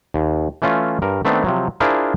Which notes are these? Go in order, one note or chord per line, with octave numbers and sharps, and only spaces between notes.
D#2
E3 A3 C#4 F4
G2 A#4
D#3 A3 B3 C4 D4
C3 F3 F#3
D4 E4 F4 G#4 A#4 C5